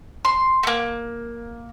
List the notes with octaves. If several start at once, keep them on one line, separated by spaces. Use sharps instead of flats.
C6
A3 A#3